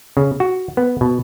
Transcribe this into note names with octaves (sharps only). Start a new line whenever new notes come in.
C#3
F#4
B3
B2